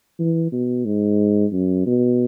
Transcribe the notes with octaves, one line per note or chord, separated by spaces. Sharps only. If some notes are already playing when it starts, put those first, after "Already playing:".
E3
B2
G#2
F#2
B2